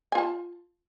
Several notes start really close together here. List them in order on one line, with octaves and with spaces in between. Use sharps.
G#5 F4 A5